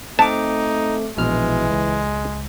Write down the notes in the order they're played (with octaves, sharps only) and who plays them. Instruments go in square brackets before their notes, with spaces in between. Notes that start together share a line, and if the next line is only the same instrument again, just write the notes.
[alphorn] A3 [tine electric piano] C4 D6 [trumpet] D#4 [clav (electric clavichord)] A5
[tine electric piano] A#1 B2 F6 [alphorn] E3 [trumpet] G#3
[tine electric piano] C#2